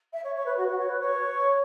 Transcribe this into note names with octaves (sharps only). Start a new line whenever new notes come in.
E5
C#5
C#5
B4
F#4
F#4
C#5
B4
C#5